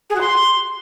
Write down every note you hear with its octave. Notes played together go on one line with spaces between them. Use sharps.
G#4
F#4
C6